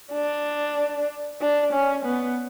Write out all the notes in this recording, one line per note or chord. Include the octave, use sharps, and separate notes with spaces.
D4
D4
C#4
B3